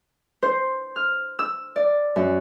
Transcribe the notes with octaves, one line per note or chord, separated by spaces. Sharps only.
C5
F6
E6
D5
F#2